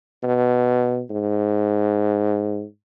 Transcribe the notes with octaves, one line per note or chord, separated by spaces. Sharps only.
B2
G#2